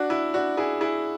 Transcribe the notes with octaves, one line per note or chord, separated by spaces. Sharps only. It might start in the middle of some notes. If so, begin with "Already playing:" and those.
Already playing: D4 F#4
E4
D4 F#4
E4 G#4
E4 G#4